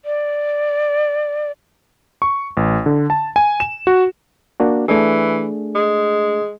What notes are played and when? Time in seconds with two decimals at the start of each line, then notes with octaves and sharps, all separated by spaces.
0.05 D5
2.22 C#6
2.57 A1
2.86 D3
3.10 A5
3.36 G#5
3.60 E7
3.87 F#4
4.60 A#3 D4 F#4
4.88 E3 A3 D4 G#4
5.75 G#3